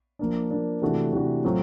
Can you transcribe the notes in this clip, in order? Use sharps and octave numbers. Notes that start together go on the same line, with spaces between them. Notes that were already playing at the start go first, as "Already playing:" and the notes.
F3 A#3 D4
F3 A#3 D4
C3 E3 A3 D4 F#4
C3 E3 A3 D4 F#4
A2 F#3 A3 C4 F4